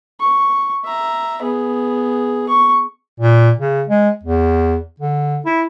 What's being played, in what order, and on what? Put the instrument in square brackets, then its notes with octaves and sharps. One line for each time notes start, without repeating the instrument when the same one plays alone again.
[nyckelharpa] C#6
E5 A#5
B3 G#4
C#6
[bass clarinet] A#2
C#3
G#3
E2
D3
E4